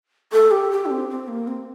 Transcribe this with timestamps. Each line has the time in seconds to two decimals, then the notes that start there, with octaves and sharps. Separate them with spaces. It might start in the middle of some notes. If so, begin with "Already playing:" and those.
0.32 A4
0.51 G4
0.71 G4
0.86 D4
0.90 C4
1.09 C4
1.28 A#3
1.47 C4